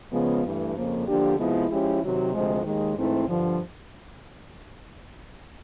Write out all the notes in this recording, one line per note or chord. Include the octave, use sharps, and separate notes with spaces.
C#3 F3 G#3 B3
G2 E3 A3
F2 C#3 F3 A#3
D3 F3 A#3 D4 G4
C3 F3 G#3 B3 E4
F3 G#3 C#4 E4 G4
C3 D#3 F#3
D2 C3 F3 G#3
D#2 D#3 G#3
G#2 E3 A3 C4 E4
G2 D3 F3